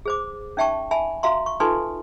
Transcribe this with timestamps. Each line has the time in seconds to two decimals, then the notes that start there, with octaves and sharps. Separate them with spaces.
0.06 G#4 C5 D6
0.57 C#4 D#4 E5 G5 A5 C#6
0.91 E5 G#5 A5 B5
1.23 F#4 E5 F5 A#5 C6
1.46 C#6
1.60 D#4 F4 A4 B4 G#5 C6